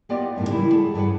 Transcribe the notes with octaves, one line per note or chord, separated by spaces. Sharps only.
A#3 B3 F4 G4 D5 D#5
F#2 A2 D#4
C#3 E3 G3 G#3 A#3 E4
G#4 A4 F#5
G2 C#3 G3 B4 F#5